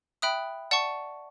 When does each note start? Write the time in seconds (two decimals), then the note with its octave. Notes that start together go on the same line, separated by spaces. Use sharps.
0.22 E5 G5 B5 D#6 F#6
0.71 D5 F#5 A5 C#6